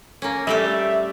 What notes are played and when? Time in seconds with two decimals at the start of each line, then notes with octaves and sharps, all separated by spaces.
0.22 A#3 C#4
0.47 G3 A3 G4 E5